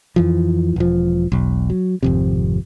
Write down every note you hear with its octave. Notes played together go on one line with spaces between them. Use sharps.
F2 E3 F3
E1 F3
E1 B1
F#3
G#1 F2 C3